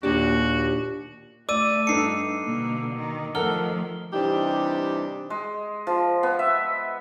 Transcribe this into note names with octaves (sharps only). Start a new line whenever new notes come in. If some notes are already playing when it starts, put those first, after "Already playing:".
D#2 A#2 D4 F#4 G4
A3 D5 D6 E6 D#7
G2 D#4 A4 C7 C#7
B2 D3 A#3
D#3
D#3 F3 A3 A4 A#4 F#5 F6 G7
C3 E3 G3 D4 D#4 G4
G#3
F3
B3
E5